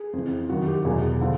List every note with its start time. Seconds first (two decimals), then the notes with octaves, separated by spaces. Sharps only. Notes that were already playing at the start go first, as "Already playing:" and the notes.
Already playing: G#4
0.13 F2 C#3 E3
0.49 F#2 D#3 F#3 F#4
0.68 G4
0.85 E2 B2 F#3 G#4
1.21 D3 F3